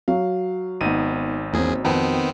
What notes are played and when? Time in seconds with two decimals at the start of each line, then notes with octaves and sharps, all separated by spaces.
0.08 F#3 F5
0.81 G#1 B3 D#4 D#7
1.53 E2 A#3 C4 C#4 G#4
1.84 F2 D#3 B3 C4